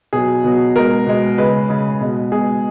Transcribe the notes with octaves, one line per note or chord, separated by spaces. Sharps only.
B2 F#3 G#4
B2 F#3
B2 G#3 A#4
B2 G#3
C#3 G#3 B4
C#3 G#3
B2 G#3
B2 G#3 G#4